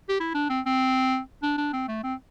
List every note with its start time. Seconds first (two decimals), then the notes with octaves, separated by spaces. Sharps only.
0.09 G4
0.20 E4
0.34 D4
0.50 C4
0.66 C4
1.42 D4
1.58 D4
1.73 C4
1.88 A3
2.03 C4